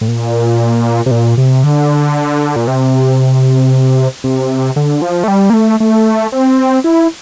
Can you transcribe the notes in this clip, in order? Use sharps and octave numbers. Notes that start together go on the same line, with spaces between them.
A2
A#2
C3
A#2
C3
D3
A#2
C3
C3
D3
F3
A3
G3
A#3
A3
A3
C4
E4